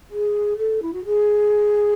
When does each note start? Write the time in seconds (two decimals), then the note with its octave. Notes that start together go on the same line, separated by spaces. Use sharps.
0.10 G#4
0.57 A4
0.82 E4
0.93 F#4
1.05 G#4